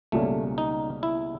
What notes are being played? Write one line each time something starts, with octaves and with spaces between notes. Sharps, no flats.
C#2 B2 G3 A3 A#3 C#4
D#4
E4